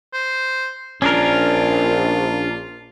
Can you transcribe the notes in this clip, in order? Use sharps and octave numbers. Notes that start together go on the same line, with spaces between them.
C5
A#1 C#4 D4 F4 A#4